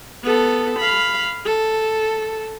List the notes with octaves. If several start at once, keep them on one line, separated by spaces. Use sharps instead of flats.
B3 A4
F5 B5
A4